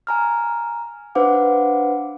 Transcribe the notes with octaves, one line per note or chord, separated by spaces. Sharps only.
G#5 A#5 F6
D4 B4 C5 F5 F#5 D6